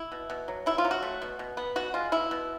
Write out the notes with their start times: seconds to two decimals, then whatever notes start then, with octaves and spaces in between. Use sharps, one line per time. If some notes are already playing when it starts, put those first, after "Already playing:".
Already playing: E4
0.12 B2
0.30 B2
0.48 F#3
0.66 B2 E4
0.78 F4
0.85 F#3
0.91 F#4
1.03 A3
1.22 B2
1.39 B2
1.57 B3
1.76 B2 F#4
1.94 G#3 F4
2.12 B2 E4
2.31 B2